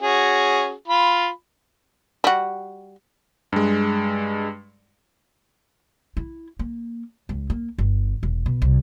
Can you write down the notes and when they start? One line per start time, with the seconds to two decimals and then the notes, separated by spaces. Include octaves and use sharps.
0.01 C#4 F#4 G#4
0.88 F4 B5
2.24 G3 F#4
3.53 G2 G#3
6.17 E4
6.59 A#3
7.29 C#2
7.50 A#3
7.78 G1
8.23 E1
8.46 B2
8.62 C2